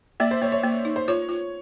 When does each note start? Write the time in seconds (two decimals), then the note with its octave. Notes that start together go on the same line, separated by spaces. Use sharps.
0.20 A#3 D5 E5
0.31 C5
0.42 A#3 C#5
0.52 C#5
0.63 A#3
0.85 D#4
0.96 C5
1.08 F4 C#5
1.29 F4